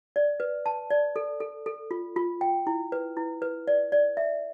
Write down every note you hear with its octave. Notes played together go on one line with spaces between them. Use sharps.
D5
B4
A5
D5
A4
A4
A4
F4
F4
G5
E4
B4
E4
B4
D5
D5
E5